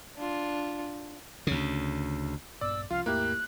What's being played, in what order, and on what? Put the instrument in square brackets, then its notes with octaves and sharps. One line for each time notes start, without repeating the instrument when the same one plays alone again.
[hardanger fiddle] D4 F4
[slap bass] D2 C#3
[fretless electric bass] A#1 G2 B3 [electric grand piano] D5 [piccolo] E6
[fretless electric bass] C2 F3 C#4 [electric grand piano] F4 [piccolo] F5
[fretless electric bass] D#2 G#2 A3 [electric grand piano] A#3 E4 G4 [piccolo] F#6